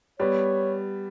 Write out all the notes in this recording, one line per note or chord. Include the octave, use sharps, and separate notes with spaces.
G3 B3 C#5